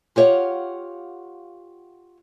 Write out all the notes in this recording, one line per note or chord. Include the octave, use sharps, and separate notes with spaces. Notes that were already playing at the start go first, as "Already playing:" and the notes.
F4 G4 C#5 D5 F5 F#5